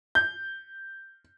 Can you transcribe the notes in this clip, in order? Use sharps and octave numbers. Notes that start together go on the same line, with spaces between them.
G6